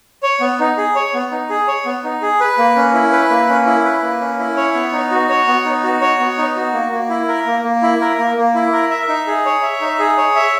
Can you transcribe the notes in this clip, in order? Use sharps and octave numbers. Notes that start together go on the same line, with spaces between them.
C#5
B3
D#4
G#4
C#5
B3
D#4
G#4
C#5
B3
D#4
G#4
B4
A#3
C#4
E4
B4
A#3
C#4
E4
B4
A#3
C#4
E4
C#5
B3
D#4
F#4
C#5
B3
D#4
F#4
C#5
B3
D#4
F#4
A#3
A#3
E4
A#4
A#3
A#3
E4
A#4
A#3
A#3
E4
A#4
E5
D#4
G#4
C#5
E5
D#4
G#4
C#5
E5